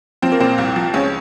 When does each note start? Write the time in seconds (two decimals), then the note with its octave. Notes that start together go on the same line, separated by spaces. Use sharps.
0.22 F3 C4
0.32 A#3
0.40 A#2 C4
0.58 C2
0.76 F3
0.94 C#2 C#4